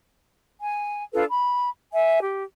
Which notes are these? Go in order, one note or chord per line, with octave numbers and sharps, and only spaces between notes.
G#5
D4 F4 A4 B4
B5
E5 G#5
G4